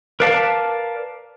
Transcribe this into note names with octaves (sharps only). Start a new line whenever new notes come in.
A#4 B4 D5 F5 A5